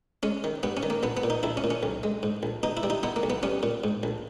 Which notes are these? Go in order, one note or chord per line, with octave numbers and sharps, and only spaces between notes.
G#3 C#4
D#3
G2 B3
C#4
D#3
A#3
A#1 B3
B3
A#2
D#4
A#1 E4
C#4
A#2
C#4
B1
G#3
G#2
A#1
B2 D#4
E4
G3
D#4
B2 B3
A#3
B1
B3
G3 C#4
A#2
G#2
A#1